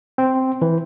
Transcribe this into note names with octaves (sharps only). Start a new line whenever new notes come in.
C4
E3